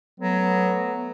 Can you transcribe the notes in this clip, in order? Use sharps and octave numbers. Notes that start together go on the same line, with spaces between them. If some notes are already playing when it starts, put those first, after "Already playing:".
F#3 A3 B3